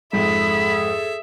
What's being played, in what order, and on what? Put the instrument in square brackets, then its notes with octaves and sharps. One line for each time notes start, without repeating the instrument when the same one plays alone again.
[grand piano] F2 G#2 [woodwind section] G#4 A4 [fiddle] E5 [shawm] B5